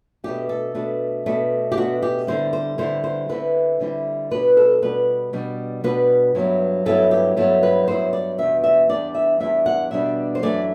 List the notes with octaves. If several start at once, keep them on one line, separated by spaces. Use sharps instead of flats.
B2 A3 D4 G4
A4
B2 A3 D4
B2 A3 D4
G4
B2 A3 D4 F#4
G4
D3 G3 C4 E4 C5
C5
D3 G3 C4 E4 C5
C5
D3 G3 C4 E4 B4
D3 G3 C4 E4
B2 G3 D4 B4
A4
B2 G3 D4 B4
B2 G3 D4
B2 G3 D4 B4
G2 F#3 B3 E4
G2 F#3 B3 E4 A4
G4
G2 F#3 B3 E4 A4
B4
G2 F#3 B3 E4 C5
D5
E2 B2 G3 D4 E5
E5
E2 B2 G3 D4 D5
E5
E2 B2 G3 D4 E5
F#5
E2 B2 G3 D4 E5
C5
F#2 E3 A3 D4 D5